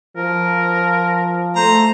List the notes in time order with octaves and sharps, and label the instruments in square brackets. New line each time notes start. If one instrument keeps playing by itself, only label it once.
[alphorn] F3 [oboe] A#4
[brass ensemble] A3 [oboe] C5 [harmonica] A#5